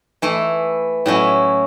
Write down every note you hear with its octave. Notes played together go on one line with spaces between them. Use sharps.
E3 A3 E4
A2 F#3 C#4 E4